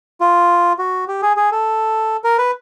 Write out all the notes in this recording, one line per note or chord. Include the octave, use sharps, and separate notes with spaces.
F4
F#4
G4
G#4
G#4
A4
A#4
B4